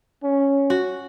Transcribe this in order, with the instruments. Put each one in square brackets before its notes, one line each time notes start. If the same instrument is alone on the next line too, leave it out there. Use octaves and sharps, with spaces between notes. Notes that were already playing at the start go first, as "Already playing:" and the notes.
[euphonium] C#4
[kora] F#4